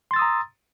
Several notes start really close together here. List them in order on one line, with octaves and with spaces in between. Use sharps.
C6 A6 E6 D#6 A#5